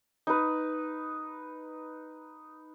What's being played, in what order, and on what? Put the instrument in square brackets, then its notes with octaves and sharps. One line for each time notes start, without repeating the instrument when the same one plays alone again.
[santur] D#4 B4